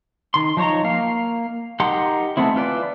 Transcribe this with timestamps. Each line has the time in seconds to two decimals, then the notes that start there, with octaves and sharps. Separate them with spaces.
0.34 D#3 C6
0.57 F3 D#4 C#5 A#5
0.84 A#3 F5
1.80 D#4 G4 A#4 F#5 C6
2.37 G#3 A3 B3 C4 E4
2.55 E3 F4 B4 D5